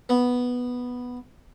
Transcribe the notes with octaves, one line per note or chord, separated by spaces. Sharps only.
B3